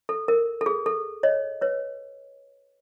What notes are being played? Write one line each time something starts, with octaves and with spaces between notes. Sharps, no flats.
A4
A#4
A4
G#4
A4
C#5 D#5
B4 C#5